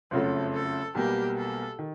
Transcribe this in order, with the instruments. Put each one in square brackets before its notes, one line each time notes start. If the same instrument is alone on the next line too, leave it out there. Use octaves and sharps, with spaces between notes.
[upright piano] F#1 F2 C#3 F#3 A3 [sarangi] A4
[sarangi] A4
[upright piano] B1 B2 G3 A#3 [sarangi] G4
[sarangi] A4
[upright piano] D#3